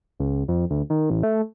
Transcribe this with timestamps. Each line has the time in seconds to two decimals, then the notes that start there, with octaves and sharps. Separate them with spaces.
0.20 C#2
0.48 F2
0.70 D2
0.90 D#3
1.10 A1
1.23 A3